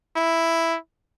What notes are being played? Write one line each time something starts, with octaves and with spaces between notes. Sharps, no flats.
E4